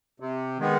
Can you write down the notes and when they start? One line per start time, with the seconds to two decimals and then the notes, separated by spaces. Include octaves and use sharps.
0.20 C3
0.58 D#3 G#3 B3